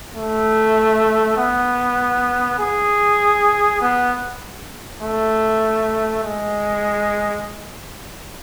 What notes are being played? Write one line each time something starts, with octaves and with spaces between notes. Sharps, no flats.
A3
B3
G#4
B3
A3
G#3